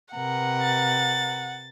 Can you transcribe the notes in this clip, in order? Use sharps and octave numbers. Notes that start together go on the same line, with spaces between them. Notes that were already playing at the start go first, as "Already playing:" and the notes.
C3 A#4 B4 F#5
A6